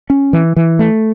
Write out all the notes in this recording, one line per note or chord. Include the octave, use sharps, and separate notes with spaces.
C#4
E3
E3
A3